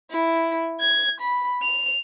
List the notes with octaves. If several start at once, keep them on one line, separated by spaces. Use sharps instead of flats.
E4
G#6
B5
F7